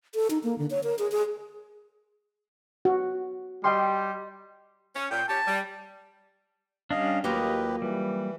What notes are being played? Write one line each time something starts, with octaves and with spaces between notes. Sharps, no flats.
A4
D#4
A#3
D3
C#5
A#4
G#4
G#4
F#4
G3 D#5 G5 C6
C#4
A#2 G5
C#4 G4 A5
G3
G3 C#4 D4 D#5 F5
D#2 F#3 A#3 F4 G4 B4 D#5
E3 G3